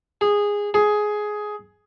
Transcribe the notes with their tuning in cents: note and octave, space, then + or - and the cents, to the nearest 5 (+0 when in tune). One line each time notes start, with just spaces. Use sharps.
G#4 -15
G#4 +10